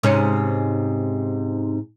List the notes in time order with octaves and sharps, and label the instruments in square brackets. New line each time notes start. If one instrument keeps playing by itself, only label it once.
[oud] G#2 C3 C#4